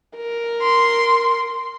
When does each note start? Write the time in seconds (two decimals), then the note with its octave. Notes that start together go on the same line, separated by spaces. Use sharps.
0.17 A#4
0.62 C6